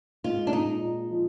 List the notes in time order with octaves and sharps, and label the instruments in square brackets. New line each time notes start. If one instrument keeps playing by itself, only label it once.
[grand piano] G#3 [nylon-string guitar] F4
[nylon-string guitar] D4
[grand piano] A#2 [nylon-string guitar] D#4
[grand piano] A#2
F3